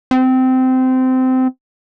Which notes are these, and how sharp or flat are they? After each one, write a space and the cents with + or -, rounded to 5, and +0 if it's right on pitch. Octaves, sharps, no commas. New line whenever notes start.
C4 -20